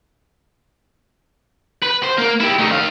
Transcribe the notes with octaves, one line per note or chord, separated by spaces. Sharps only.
B4
C5
A#3
E4 G4
A3 D#4
D#3 F5